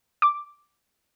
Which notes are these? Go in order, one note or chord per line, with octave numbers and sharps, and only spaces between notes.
D6